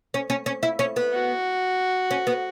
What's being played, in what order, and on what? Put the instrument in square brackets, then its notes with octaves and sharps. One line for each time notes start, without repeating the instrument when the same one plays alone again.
[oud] C#4
C#4
C#4
E4
C#4
B3
[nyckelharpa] F#4
[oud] C#4
B3